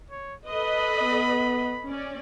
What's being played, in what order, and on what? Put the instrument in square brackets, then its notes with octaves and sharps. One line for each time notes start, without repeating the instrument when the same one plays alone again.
[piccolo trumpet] C#5
[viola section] A4 B4 D#5 [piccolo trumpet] B5
[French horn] B3
[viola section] C#4 D5